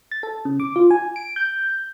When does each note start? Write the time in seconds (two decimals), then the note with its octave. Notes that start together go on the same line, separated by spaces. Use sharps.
0.12 A6
0.23 A4
0.45 C#3
0.60 D6
0.76 F4
0.91 G#5
1.16 D7
1.36 G6